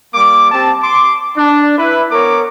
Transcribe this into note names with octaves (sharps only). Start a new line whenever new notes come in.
G3 A#3 D6
C4 G4 A5
C6 D6
D4
E4 B4
B3 A#4 C#5 D6